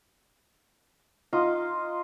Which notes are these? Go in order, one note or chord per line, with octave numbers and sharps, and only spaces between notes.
D#4 F4 D#5